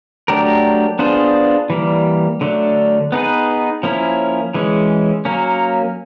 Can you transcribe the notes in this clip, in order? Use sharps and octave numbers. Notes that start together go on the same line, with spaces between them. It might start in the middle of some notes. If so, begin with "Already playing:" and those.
F#3 A3 D4 G4 A#4
B3 D4 F4 G#4 C5
E3 G3 A#3
D3 F#3 A3 D4
B3 D#4 G#4 B4
F3 A#3 C#4 E4
E3 G#3 C#4
F#3 A#3 C#4